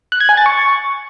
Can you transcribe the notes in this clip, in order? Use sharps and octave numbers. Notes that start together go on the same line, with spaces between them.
F#6
G#6
G#5
A6
C#6